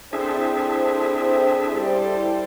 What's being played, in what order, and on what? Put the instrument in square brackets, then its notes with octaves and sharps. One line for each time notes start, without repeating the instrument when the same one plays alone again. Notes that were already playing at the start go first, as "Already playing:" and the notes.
[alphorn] C4 [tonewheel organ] D4 G#4 E5 [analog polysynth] E4 A4 C5
[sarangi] G3